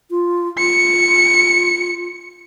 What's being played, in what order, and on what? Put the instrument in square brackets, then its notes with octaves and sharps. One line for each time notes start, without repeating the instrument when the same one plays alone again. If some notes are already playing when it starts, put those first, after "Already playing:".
[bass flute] F4
[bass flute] F4 [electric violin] C#7